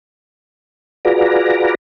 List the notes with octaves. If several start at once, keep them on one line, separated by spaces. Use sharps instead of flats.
F4 F#4 G#4 B4 D5 A#5